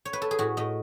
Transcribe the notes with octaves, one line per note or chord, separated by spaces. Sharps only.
C#5
B4
A4
G#4
A2 F#4
A2 D#5